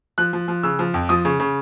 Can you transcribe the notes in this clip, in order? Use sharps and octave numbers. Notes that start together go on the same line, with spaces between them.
F3 F#6
F3
F3
C#3 E6
F3
F2
F3 D#6
C#3
C#3